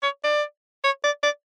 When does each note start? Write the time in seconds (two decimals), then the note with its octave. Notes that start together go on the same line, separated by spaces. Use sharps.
0.03 C#5
0.24 D5
0.84 C#5
1.04 D5
1.23 D5